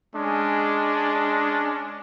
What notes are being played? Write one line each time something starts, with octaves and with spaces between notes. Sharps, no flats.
G#3 C#4 D4